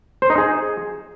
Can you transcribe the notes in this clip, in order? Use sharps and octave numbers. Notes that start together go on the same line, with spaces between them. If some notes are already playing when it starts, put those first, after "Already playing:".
C5
D#4
G#4